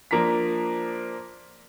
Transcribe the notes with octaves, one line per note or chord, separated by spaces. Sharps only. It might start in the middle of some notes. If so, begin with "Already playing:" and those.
F3 A#3 D4 A#5 B6